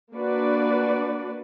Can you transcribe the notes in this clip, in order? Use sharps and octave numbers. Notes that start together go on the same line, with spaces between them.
A#3 D4 F#4 B4 D5